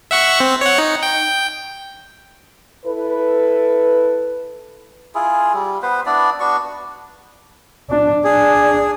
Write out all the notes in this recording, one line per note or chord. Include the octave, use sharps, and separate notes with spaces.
E5 F#5 C#6
C4
C#5 F#5
D#4
G5
E4 A4 B4
E4 F4 G#4
G3
B3 B4 C5
B3 D4 E4 D5
B3 D4 F#4 C#6
D4
D4 G#4